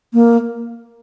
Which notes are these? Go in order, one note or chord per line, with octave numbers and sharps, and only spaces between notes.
A#3